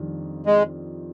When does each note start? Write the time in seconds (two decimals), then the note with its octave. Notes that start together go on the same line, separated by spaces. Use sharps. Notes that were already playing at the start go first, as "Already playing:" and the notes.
Already playing: F2 D#3 G3 D4
0.46 G#3